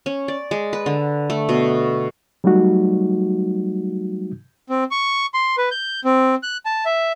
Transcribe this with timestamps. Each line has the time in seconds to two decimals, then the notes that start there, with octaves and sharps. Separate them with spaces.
0.06 C#4
0.28 D5
0.51 G#3
0.73 B4
0.86 D3
1.30 A3
1.49 B2
2.44 F#3 G3 A3 D#4 F#4
4.69 C4
4.91 C#6
5.34 C6
5.58 B4
5.71 G6
6.04 C4
6.43 F#6
6.66 A5
6.85 E5